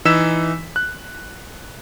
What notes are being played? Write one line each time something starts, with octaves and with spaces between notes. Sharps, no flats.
E3 D#4 E6 B6 E7
F#6